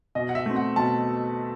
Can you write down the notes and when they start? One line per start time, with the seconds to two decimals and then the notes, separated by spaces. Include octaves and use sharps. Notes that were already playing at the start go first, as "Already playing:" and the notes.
0.15 B2 D#5
0.29 F#5
0.35 E5
0.46 A3 C4
0.56 F#5
0.76 B2 A5